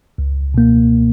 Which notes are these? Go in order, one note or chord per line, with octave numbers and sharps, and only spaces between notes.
C#2
B2 A#3